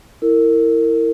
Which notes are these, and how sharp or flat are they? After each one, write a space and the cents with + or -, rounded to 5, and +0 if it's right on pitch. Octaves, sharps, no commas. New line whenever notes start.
E4 +0 A#4 -30